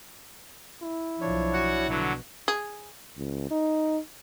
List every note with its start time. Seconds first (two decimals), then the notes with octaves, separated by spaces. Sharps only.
0.82 E4
1.21 B1 F3 D4 C#5
1.53 F#4 F#5
1.89 B2 D3 F#3 F#5
2.48 G#4
3.17 C#2
3.51 D#4